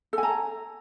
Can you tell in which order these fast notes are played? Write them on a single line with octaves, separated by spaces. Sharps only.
A4 G#5 A#5